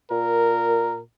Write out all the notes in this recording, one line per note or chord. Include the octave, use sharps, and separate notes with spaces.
A#2 A#4